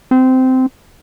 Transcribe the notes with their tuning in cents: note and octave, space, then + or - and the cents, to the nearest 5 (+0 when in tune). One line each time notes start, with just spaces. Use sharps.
C4 -15